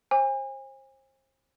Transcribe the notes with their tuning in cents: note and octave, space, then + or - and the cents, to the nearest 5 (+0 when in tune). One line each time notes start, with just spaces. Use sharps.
C5 +35 G#5 -35